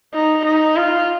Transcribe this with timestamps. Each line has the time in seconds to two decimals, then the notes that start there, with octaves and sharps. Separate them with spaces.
0.14 D#4
0.45 D#4
0.76 F4